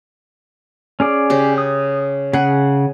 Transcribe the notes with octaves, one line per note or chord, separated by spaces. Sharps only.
C#4 G#4 D5
C#3 G4
D#6
C#3 G#4 F#5